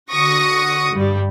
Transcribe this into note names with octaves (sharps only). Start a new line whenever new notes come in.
D3 F#4 C#6 D#6 A#6
G2 G3